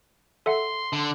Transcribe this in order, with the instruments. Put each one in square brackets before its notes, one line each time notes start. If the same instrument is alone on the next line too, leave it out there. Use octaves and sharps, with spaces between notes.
[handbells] A4 E5 F#5 [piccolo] C6
[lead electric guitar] D3